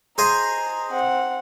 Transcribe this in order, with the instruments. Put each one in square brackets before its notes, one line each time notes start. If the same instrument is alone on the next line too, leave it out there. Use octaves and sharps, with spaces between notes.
[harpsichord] G#4 C5 D#5 [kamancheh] A#5
[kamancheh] C4 F#5